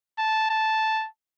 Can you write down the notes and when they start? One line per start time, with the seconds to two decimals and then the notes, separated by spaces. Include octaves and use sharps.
0.18 A5
0.50 A5